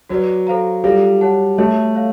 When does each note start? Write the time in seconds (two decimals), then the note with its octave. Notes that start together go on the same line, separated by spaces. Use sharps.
0.09 F#3 F#4 B4 D5
0.47 A4 C5 F5 A#5
0.84 G3 F4 A4 D5 F5
1.21 C#5 F#5 A5
1.58 A3 F#4 A4 C#5 E5
1.95 C#5 F5